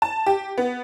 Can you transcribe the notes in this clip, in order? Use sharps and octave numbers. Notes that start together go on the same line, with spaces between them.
A5
G4
B3